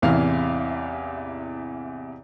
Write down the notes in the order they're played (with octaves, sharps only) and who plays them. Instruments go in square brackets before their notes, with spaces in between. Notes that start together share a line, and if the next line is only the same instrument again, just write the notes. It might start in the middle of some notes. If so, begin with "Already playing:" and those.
[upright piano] A1 E2 C3 E3 F5